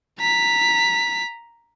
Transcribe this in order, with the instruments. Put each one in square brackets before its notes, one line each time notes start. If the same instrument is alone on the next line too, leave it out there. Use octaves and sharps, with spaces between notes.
[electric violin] A#5 B6